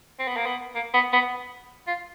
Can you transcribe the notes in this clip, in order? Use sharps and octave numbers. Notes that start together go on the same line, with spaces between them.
C4
B3
A#3
B3
A#3
B3
B3
F4